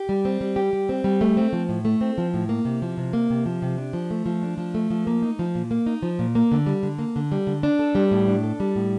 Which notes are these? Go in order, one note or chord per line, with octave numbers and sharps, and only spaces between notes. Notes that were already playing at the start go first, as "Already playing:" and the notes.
Already playing: G4
G3
C4
G3
G4
G3
C4
G3
A3
C4
F3
A2
A3
C4
F3
A2
A#3
C3
F3
C3
A#3
C3
F3
C3
D4
F3
A3
F3
D4
F3
A3
F3
A#3
D#4
F3
A#2
A#3
D#4
F3
A#2
A#3
D3
G3
D3
A#3
D3
G3
D3
D4
A4
G3
A2
D4
A4
G3
A2